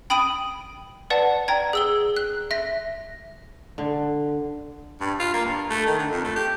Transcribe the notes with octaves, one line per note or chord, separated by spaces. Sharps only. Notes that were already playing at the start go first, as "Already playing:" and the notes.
G5 B5 D#6 D7 D#7 F#7
B4 D5 F#5 A5
D5 G5 A#5 G#6
G#4 E6 G7
F#6
E5 A#6
D3
G2
F4
A#3
G2
A3
D#3
D3
F2
A3
G4